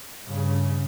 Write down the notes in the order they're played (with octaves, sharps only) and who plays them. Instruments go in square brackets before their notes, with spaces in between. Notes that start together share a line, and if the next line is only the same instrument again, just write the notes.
[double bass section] G2 C#3